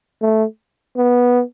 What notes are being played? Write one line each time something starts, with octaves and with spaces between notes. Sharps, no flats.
A3
B3